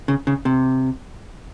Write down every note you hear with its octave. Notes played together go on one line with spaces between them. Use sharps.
C#3
C#3
C3